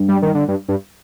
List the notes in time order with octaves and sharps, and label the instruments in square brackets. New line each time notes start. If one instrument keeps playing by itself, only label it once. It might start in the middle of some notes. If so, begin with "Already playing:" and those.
Already playing: [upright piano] G2
[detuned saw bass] G3
D#3
D3
G2
G2